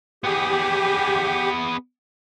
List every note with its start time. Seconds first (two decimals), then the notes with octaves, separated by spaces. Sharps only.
0.24 B3 G4 G#4